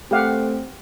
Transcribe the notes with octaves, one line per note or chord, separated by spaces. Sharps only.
A3 C4 G4 F5 F#5